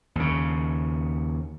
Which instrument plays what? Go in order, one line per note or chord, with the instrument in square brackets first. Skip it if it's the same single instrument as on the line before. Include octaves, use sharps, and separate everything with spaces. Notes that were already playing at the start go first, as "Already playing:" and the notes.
[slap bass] D#2 C#3